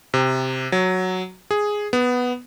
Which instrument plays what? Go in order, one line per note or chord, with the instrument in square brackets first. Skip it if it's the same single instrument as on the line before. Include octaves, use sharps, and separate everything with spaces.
[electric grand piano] C3
F#3
G#4
B3